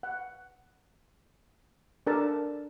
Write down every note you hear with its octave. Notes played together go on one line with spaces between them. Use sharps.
F#5
D4 A4 A#4 A5